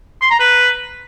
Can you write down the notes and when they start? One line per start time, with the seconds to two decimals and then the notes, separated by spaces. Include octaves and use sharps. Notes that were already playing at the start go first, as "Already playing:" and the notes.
0.21 C6
0.31 A#5
0.40 B4